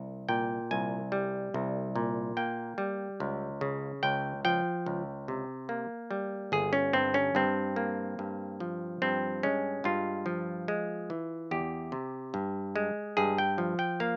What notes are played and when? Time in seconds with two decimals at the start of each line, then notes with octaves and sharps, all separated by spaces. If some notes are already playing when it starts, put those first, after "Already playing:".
Already playing: C2
0.29 A#2 G5
0.71 C2 G#5
1.12 G3
1.54 C2
1.96 A#2
2.37 A#3 G5
2.78 G3
3.20 C#2
3.61 C#3
4.03 C#2 G5
4.45 F3 G5
4.86 C#2
5.28 C3
5.69 A#3
6.11 G3
6.52 G1 G#4
6.73 C#4
6.93 G2 C4
7.14 C#4
7.35 G2 C4
7.76 A#3
8.19 G2
8.60 F3
9.02 G2 C4
9.43 G#3 C#4
9.84 G2 F4
10.26 F3
10.68 G#3
11.10 E3
11.51 E2 G4
11.92 C3
12.34 G2
12.76 G#3
13.17 G2 G#4
13.38 G5
13.58 F3
13.79 G5
14.00 A#3 F5